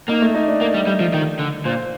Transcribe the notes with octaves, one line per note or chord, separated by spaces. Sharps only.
A#3 D#4
A3
D#4
D4
A#3
G3
G3
F3
D#3
D3
A#2 C5